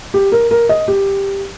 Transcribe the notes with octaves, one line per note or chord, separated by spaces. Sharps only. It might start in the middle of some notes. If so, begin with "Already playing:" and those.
G4
A#4
A#4
D#5
G4